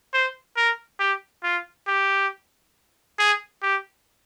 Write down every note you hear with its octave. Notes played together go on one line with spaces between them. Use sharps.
C5
A#4
G4
F4
G4
G#4
G4